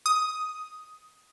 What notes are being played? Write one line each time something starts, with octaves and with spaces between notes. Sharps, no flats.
D#6